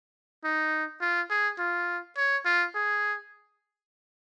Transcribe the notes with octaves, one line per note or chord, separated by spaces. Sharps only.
D#4
F4
G#4
F4
C#5
F4
G#4